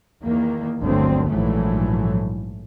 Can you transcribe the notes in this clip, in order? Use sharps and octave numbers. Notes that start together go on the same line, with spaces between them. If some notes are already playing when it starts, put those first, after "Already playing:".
E2 D#3 A#3
G1 D2 D3 F#3 C4
A#1 G#2 E3 F#3 A3